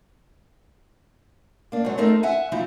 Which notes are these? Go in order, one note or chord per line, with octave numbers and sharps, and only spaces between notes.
A#3 D4
G#2 F#3
A3 C4 D#4 A4 A#4
E5 F#5 G#5
F3 F#3 D#4 E4